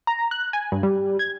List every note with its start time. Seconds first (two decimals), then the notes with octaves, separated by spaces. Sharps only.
0.07 A#5
0.31 F#6
0.53 G#5
0.72 G2
0.83 G3
1.19 G#6